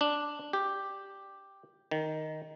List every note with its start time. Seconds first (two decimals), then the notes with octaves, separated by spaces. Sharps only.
0.01 D4
0.53 G4
1.91 D#3